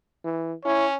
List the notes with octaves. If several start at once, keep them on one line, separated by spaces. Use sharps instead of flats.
E3
C#4 E4 C#5